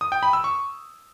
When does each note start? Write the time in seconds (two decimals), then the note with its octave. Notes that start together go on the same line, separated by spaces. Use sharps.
0.01 D#6
0.12 G5
0.23 B5
0.33 E6
0.44 C#6